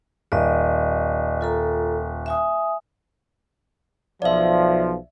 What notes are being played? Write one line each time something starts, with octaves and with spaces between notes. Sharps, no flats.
D#1 D5 D#5
F4 A4 A#5
E5 G#5 D#6
B1 F3 D5 E5